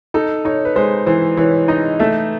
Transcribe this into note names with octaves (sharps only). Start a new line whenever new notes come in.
D#4 A4
D#4 C#5
B4
G#3 C5
E3 C5
E3 C#5
D#4 D#5
A3 E5